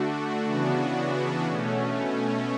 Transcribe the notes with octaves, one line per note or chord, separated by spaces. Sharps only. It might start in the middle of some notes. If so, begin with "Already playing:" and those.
Already playing: D3 A3 D4 F#4
C#3 E3 B3 D4 F#4
B2 A3 C#4